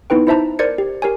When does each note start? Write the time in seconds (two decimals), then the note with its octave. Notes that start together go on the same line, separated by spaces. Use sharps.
0.10 B3 D#4 E4 B4 G5
0.27 D#4 E4 C5 E5 A5 A#5
0.59 A#4 C5 D5 G#6 C#7
0.78 G4
1.02 G4 A#4 C#5 G#5